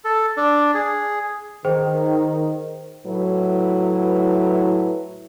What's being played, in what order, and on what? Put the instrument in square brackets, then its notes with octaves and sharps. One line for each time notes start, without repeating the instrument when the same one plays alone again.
[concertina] A4
D4
G#4
[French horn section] D#3 [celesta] G#4 C5 G5
[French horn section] A2 F#3 E4 B4